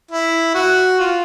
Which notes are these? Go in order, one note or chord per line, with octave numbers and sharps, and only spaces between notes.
E4
F#4
F4